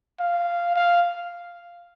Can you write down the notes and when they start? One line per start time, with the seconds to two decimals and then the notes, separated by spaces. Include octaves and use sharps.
0.20 F5
0.76 F5